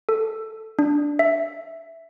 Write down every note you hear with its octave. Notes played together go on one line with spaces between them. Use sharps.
A4
D4
E5